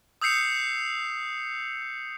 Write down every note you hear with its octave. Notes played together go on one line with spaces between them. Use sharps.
D#6 E6 G6 C7 C#7 F7